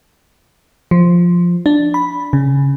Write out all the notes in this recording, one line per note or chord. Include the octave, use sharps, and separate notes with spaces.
F3
D4
B5
C#3